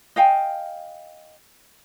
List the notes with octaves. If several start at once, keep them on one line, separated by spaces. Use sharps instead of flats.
D#5 F5 G5 G#5